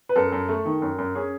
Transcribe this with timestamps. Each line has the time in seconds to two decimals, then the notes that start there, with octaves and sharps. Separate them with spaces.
0.09 B4
0.16 F#2 A4
0.32 F#2
0.49 A3
0.65 D#3
0.82 F#2
0.98 F#2
1.15 C#4 G#4